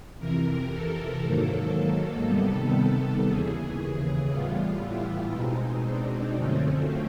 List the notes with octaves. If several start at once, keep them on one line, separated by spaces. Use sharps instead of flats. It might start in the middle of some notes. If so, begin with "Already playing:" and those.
F2 C3 E3 A#4
A4
G#2 D#3 F#3 A#3
C3 D#3 G3 B3 A4
D#2 C#3 E3 G#4
A2 E3 G3 B3 F4
E4
B2 G#3 C4 D#4
D4
F#2 D3 F3 A3 C4 C#4